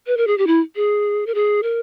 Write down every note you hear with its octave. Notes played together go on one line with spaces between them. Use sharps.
B4
A#4
G#4
G4
E4
G#4
A#4
G#4
A#4